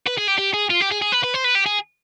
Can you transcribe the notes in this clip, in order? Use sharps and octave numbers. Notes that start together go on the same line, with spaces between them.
B4
G#4
G4
G4
G#4
F4
G4
G#4
G#4
B4
B4
C5
B4
G4
G#4